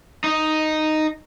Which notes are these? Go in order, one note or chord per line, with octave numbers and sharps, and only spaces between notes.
D#4